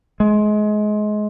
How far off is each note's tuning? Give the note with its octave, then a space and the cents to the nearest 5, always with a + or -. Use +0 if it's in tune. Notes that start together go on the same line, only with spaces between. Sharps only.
G#3 +25